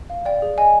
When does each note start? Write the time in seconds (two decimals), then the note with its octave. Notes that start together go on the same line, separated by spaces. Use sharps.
0.10 F5
0.25 D5 G5
0.42 G#4
0.58 D#5 G#5